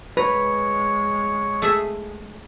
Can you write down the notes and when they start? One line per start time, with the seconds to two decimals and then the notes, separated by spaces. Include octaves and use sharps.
0.17 G#3 B4 C#5 A#5
1.62 A3 G#4 E5